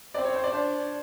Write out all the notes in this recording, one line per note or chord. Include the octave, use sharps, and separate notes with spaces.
C4 D5
C#5
C5
D5
D4 C5